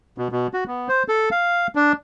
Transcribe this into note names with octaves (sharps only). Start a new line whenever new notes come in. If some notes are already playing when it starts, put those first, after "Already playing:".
B2
B2
F#4
B3
C5
A4
F5
D4